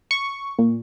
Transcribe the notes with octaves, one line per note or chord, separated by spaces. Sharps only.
C#6
A#2